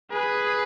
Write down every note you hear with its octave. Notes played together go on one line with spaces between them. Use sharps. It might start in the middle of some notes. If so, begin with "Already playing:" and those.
G#4 B4